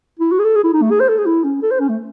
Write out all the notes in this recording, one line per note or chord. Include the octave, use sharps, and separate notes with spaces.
E4
F#4
G#4
A4
G#4
E4
D#4
A3
G#4
C5
A4
G#4
E4
C#4
A4
C5
C#4
A3